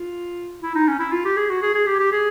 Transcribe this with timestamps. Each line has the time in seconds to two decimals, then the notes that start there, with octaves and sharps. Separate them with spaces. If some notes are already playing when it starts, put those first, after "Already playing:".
Already playing: F4
0.63 E4
0.75 D#4
0.88 C#4
1.00 E4
1.12 F4
1.25 G4
1.37 G#4
1.50 F#4
1.62 G#4
1.75 G#4
1.87 G4
2.00 G4
2.12 G#4